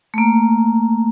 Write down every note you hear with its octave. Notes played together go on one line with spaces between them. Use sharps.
A3 A#3